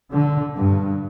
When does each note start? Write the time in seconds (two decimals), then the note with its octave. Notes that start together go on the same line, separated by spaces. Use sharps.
0.11 D3
0.54 G2